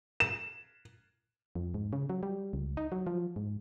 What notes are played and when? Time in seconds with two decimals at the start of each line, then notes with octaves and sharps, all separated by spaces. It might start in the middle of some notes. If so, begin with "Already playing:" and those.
0.20 E7
1.55 F2
1.74 G#2
1.93 C#3
2.10 F#3
2.23 G3
2.53 C#2
2.77 D#4
2.92 F#3
3.07 F3
3.36 G#2